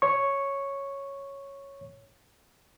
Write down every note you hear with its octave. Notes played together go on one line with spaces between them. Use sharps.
C#5 C#6